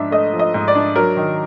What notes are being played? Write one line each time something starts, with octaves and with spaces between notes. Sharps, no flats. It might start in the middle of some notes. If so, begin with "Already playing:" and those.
Already playing: G#2 F3 D4 E5
A3 D#5
F3
D#5
G#2
D5
D4
F#3 A#4
D#3